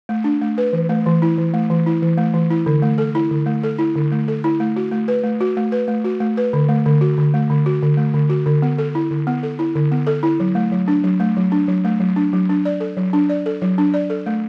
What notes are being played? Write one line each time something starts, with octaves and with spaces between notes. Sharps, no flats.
A3
D4
A3
B4
E3
A3
E3
E4
E3
A3
E3
E4
E3
A3
E3
E4
D3
A3
A4
E4
D3
A3
A4
E4
D3
A3
A4
E4
A3
F#4
A3
B4
A3
F#4
A3
B4
A3
F#4
A3
B4
D3
A3
D3
F#4
D3
A3
D3
F#4
D3
A3
D3
F#4
D3
B3
A4
E4
D3
B3
A4
E4
D3
B3
A4
E4
F#3
A3
F#3
D4
F#3
A3
F#3
D4
F#3
A3
F#3
D4
F#3
D4
D5
A4
F#3
D4
D5
A4
F#3
D4
D5
A4
A3